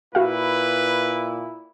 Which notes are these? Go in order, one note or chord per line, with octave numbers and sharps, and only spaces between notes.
A#2 E4 F#4 B4 F5